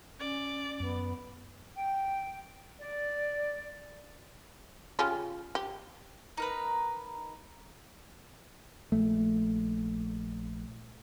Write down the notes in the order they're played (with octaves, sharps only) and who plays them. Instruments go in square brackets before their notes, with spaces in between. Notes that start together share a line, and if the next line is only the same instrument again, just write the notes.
[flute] C#4 [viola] D5
[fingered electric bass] F#2 [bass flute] B3
[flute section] G5
D5
[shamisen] C#3 F4 G4
G4
[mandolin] D#4 A#4 B4
[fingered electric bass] A#1 A3